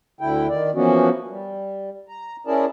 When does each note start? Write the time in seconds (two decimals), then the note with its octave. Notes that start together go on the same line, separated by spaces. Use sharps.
0.21 D2 D3 E4 G5
0.49 D#3 D5
0.75 E3 F3 A#3 B3 C#4 F#4
1.29 G3
2.08 A#5
2.47 C#4 E4 G#4 A#4 D5 A5